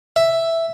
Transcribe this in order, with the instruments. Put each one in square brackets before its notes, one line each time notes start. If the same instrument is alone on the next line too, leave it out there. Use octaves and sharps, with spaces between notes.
[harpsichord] E5